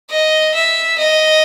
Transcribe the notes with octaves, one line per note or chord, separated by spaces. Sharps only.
D#5
E5
D#5